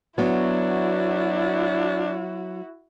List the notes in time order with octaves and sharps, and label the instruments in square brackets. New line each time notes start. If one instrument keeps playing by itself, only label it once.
[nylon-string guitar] F#3 B3 [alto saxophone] D4 [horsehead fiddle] E4 F#4